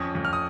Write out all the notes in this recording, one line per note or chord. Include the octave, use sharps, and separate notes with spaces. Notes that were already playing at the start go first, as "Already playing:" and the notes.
Already playing: F2 C#4 D#6
F2
F6
D#6